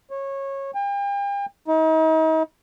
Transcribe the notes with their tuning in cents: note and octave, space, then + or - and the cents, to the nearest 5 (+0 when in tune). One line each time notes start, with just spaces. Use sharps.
C#5 -20
G5 +40
D#4 +40